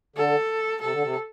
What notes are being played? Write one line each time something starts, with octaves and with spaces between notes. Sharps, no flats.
D3 A4
C3 A4
D3
C3